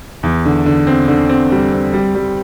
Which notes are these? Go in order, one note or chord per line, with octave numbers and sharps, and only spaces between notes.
E2
D3
D3
C4
D3
C4
G3
C4
G3
G3